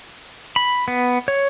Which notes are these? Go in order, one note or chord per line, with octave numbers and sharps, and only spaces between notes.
B5
B3
C#5